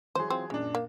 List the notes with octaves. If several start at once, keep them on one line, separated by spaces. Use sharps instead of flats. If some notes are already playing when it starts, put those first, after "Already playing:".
E3 F#3 G#4 C5
C4 F4
F#2 A#2 G#3 D4
A#3